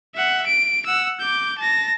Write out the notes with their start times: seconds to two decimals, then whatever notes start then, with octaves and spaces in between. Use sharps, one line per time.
0.15 E5 F#5
0.47 D7
0.86 F#5 E6
1.20 D6 G6
1.59 A5 A#6